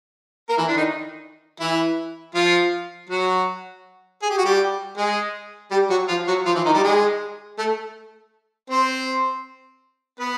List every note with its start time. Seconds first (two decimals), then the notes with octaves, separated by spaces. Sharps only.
0.49 A#3 A#4
0.57 E3 E4
0.68 D3 D4
0.76 D#3 D#4
1.60 E3 E4
2.35 F3 F4
3.09 F#3 F#4
4.23 G#4
4.30 G4
4.38 F#4
4.45 G3 G4
4.97 G#3 G#4
5.71 G3 G4
5.90 F#3 F#4
6.08 F3 F4
6.27 F#3 F#4
6.46 F3 F4
6.55 E3 E4
6.65 D#3 D#4
6.74 G3 G4
6.83 G#3 G#4
7.58 A3 A4
8.70 C4 C5
10.20 B3 B4